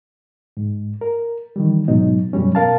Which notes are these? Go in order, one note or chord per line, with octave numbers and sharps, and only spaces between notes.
G#2
A#4
D#3 E3 G3
G#2 B2 F#3 D#4
F#2 B2 G3 C#4
B2 A#4 F5 A5